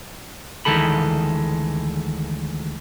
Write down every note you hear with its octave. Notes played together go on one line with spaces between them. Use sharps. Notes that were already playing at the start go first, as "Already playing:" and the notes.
D2 D#3 E3 G#3 A4 B5